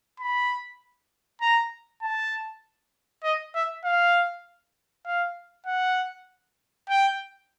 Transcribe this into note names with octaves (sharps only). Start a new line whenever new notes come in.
B5
A#5
A5
D#5
E5
F5
F5
F#5
G5